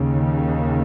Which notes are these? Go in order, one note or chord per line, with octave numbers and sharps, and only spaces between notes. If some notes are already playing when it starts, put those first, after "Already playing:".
Already playing: D#2 C#3
D#3